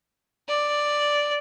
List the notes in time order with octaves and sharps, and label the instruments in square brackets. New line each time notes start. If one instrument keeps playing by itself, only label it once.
[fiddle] D5